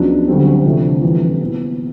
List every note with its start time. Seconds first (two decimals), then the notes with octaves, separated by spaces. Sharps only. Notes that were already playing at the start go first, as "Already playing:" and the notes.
Already playing: C#2 C#3 F3 F#3 B3 D4
0.27 D2 D3 F#3 G3 C4
0.65 C3 E3 F3 A3 D4
1.02 F#2 D3 E3 G3 C4
1.41 A#2 F#3 B3